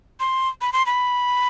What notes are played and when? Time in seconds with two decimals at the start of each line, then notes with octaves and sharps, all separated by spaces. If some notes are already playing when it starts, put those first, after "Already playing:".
0.20 C6
0.61 B5
0.73 C6
0.86 B5